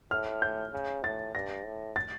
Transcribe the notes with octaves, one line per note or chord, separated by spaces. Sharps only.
A2 F6
G6
C#3
A2 A6
G2 A#6
A2
A6